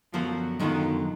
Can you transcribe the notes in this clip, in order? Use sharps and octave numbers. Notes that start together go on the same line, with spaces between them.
F#2 D3 F3 F#3 B3 F4
F#2 D3 D#3 F#3 B3 F4